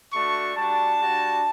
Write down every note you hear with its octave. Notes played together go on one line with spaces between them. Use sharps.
A3 D4 F#4 C#6
G3 D4 F#4 A5
G3 D4 F#4